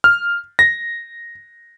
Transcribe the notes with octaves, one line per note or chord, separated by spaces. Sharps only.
F6
A#6